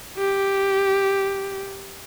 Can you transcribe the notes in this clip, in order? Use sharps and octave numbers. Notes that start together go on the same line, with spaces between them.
G4